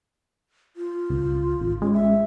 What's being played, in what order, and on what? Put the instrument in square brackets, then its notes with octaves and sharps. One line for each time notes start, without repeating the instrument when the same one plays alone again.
[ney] F4
[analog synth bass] C#2
A1
[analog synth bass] G#3 [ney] C#4
[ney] E5